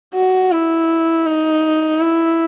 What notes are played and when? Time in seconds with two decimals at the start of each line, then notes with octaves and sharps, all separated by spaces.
0.14 F#4
0.52 E4
1.26 D#4
2.01 E4